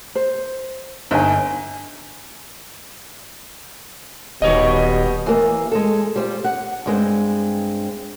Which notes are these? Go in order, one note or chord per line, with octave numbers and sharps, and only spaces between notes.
C5
G1 D#4 G#5
D#1 B2 G3 C#5 D#5
E3 A#3
G#3 A4
G3 F4 C5
F#5
G2 G#3 C4